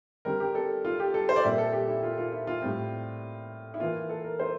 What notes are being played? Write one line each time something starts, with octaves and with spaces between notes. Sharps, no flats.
D3 G3 C4 A#4
G4
A4
F4
G4
A4
C5
D5
A#2 G3 C4 E5
A4
G4
E4
F4
F4
E4
F4
A2 G3 C4
E4
E3 A#3 F4
A4
A#4
C5